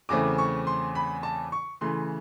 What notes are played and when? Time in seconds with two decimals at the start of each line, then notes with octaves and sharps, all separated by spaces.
0.09 E2 C#3 E3 A3 C4 D6
0.38 C#6
0.67 C6
0.95 B5
1.23 A5
1.52 C#6
1.81 C#3 E3 A3 C6